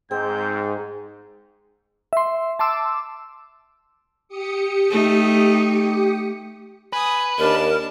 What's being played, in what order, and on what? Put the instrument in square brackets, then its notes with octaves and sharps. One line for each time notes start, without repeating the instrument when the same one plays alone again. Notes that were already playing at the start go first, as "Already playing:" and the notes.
[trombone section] G#2 [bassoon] C4 [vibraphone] G#4 [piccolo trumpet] G6
[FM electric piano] E5 C6
A5 C6 D6 E6
[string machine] G4 D#6 C#7
[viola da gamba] A3 D#4
[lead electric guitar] B4 [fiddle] G#5 D#6
[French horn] D#2 [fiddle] D4 A5 [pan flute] A#4